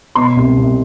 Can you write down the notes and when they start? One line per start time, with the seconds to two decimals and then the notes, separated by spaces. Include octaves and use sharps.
0.15 B2 C6
0.37 C2
0.58 C2